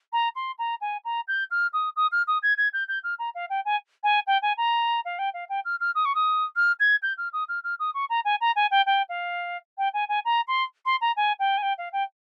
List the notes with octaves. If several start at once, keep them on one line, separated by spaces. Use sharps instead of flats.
A#5
C6
A#5
G#5
A#5
G6
F6
D#6
D#6
F6
D#6
G#6
G#6
G6
G6
F6
A#5
F5
G5
G#5
G#5
G5
G#5
A#5
F5
G5
F5
G5
F6
F6
D#6
C#6
D#6
F6
G#6
G6
F6
D#6
F6
F6
D#6
C#6
A#5
G#5
A#5
G#5
G5
G5
F5
G5
G#5
G#5
A#5
C6
C6
A#5
G#5
G5
G#5
G5
F5
G5